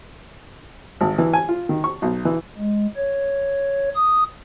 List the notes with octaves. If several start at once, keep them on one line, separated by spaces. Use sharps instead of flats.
G#1
E3
G#5
F4
D#3
C#6
B1
E3
G#3
C#5
D#6